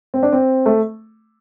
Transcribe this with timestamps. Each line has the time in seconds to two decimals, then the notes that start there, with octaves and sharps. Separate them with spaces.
0.14 C4
0.23 D4
0.32 C4
0.66 A3